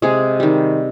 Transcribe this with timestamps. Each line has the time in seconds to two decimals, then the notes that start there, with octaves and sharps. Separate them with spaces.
0.02 C3 G#3 G#4
0.40 D#3 G3